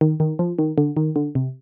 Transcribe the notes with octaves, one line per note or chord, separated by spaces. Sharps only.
D#3
D#3
F3
D#3
D3
D#3
D3
C3